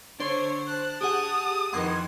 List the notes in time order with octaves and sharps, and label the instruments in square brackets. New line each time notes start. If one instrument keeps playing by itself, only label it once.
[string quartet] D3 [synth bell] D4 C5 [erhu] C#5
[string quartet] A5 [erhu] F#6
[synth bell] G4 G#4 F#5 [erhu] D#6
[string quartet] F2 D#3 E3 [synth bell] F#5 C6 G#6